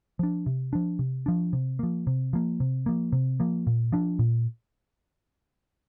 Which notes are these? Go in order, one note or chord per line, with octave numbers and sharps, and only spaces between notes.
F3 D4
C3
F3 D4
C3
F3 D4
C3
F3 A#3
C3
F3 A#3
C3
F3 A#3
C3
F3 A#3
A#2
F3 D4
A#2